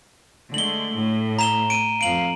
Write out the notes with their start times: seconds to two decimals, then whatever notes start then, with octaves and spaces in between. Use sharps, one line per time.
0.54 D3 G#3 A3 F#7 G7
0.96 A2
1.39 A#5 E7 G7
1.70 D7 D#7
2.01 F2 F5 D7 F#7